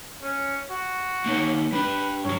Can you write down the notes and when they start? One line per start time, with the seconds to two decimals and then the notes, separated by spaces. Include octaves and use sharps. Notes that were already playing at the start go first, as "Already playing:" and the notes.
0.22 C#4
0.70 F#4
1.26 A#3 D#4 C#5
1.73 G3 D4 B4
2.24 G2 F#3 C#5